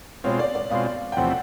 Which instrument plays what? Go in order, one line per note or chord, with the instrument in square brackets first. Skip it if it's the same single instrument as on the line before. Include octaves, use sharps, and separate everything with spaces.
[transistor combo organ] B2 G#3 C4 F4 [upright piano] C#5
[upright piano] D5
D5
[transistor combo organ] B2 G#3 C4 F4 [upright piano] F5
[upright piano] G5
[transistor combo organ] E2 C3 F3 A3 C4 [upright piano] F#5